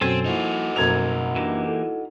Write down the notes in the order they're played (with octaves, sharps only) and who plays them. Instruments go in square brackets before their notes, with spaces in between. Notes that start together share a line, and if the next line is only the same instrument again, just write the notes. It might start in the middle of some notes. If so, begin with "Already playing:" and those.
[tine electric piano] F#2 B2 F#3 [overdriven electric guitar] C4 [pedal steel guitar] A4 C5 G#5
[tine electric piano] F3 A#3 E4 [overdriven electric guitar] D#4 F#4
[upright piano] F#1 G#6 F7 [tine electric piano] B2 F#5 A#5
[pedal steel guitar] E3 A#3 G4 [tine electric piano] D4
[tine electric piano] E4 A4